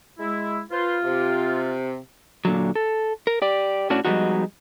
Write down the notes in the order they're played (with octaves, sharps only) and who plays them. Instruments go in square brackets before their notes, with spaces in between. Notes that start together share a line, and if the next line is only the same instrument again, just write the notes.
[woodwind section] G#3 E4
[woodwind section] F4 [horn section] B4 C5
[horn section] C3
[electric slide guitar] A#2 D3 F#3
A4
A#4
G4 D5
A2 C#4 D4 F#4
F3 G3 G#3 B3 D#4 F#4